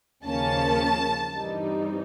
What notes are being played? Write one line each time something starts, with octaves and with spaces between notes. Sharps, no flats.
D#2 C#3 F3 A#3 C#4 A5
G2 E3 G3 C4 D#4